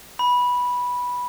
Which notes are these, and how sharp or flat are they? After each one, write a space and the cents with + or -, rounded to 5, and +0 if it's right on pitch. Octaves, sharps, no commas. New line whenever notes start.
B5 -10